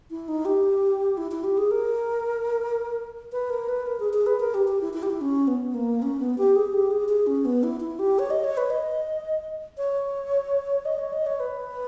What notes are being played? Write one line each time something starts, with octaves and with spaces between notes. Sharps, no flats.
E4
D#4
G4
E4
E4
G4
G#4
A#4
B4
A#4
B4
A#4
G#4
G#4
B4
A#4
G4
G4
E4
E4
G4
E4
C#4
B3
A#3
C#4
B3
G4
G#4
G4
G#4
G#4
C#4
B3
E4
E4
G4
C#5
D#5
C#5
B4
D#5
C#5
D#5
C#5
D#5
C#5
B4